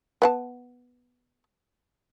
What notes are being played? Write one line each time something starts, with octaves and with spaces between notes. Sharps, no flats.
B3 F#5 A5